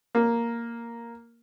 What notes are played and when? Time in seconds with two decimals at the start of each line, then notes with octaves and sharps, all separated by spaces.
0.15 A#3